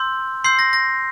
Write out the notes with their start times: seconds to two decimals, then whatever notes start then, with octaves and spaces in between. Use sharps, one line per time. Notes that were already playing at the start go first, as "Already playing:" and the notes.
Already playing: C6 E6 G6
0.44 C6 E6 G6 C7
0.59 A#6
0.73 A#6